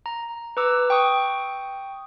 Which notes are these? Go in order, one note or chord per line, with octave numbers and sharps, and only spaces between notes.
A#5
B4 A#5 D6 E6
G5 C#6 D#6